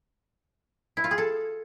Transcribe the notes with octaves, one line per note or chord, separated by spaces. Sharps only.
E4
F4
G#4
A4